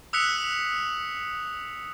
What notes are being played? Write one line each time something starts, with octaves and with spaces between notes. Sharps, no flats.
D#6 E6 F#6 B6 C#7 F7